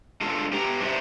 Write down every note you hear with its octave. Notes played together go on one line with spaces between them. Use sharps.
G#3 D4 F4 A4
G4 B4 G5 A#5
D4 D#4 C5 E5